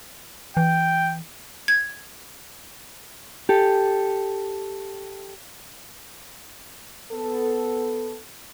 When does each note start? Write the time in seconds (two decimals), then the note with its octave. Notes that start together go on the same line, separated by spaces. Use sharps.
0.57 E3 G5
1.68 G#6
3.49 G4 A4
7.12 B3 A4